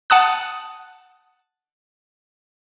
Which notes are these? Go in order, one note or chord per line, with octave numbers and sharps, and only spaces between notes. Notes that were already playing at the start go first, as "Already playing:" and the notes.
F#5 A5 D#6 F#6